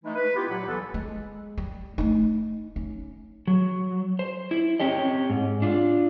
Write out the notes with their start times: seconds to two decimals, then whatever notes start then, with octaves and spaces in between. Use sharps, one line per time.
0.04 E3 G#3 A3 D#4
0.15 B4
0.35 B3 E4 F4 G4
0.49 A#2 F#3 F#5 B5
0.67 C2 E3 B3 A4
0.94 G#3
1.57 G3
1.98 A3 D#4
2.76 C#4
3.47 F#3
4.19 C5
4.51 E4
4.80 C4 C#4 G4 D#5
5.30 G#2
5.62 D4 F4